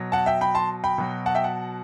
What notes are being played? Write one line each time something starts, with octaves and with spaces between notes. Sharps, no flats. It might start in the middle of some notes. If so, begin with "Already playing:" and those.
Already playing: B2 F#3
F#5 A5
E5 G5
G5 B5
A5 C6
G5 B5
B2 F#3
F#5 A5
E5 G5
F#5 A5